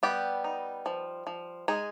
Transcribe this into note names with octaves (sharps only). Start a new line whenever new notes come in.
G3 B3 G4
D#4
F3
F3
G#3 D#4 G#4